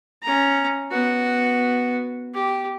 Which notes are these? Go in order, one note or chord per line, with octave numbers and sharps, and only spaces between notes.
C#4 A#5
B3 F#4
G4